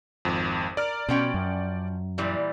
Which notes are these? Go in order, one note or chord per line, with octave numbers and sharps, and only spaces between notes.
G#1 F2
A#4 D5 F6
B2 F3 C#4 G5
F#2
A#2 E3 G3